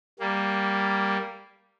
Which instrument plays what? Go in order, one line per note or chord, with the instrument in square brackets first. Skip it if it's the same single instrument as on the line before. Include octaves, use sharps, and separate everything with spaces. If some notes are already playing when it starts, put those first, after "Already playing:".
[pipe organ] G3 A#3